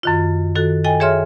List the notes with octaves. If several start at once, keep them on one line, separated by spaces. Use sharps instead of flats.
F#2 D#3 F4
D#3 F#4 A4
A4 D#5 G5 G#5
G#4 C#5 E5 C6 F6